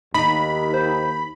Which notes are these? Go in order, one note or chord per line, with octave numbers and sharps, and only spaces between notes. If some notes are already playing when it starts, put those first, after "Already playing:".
D#2 D#4 B5
C5